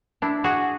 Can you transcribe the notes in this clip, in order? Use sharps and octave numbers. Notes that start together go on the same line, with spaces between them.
D4 E4
F#4 G#4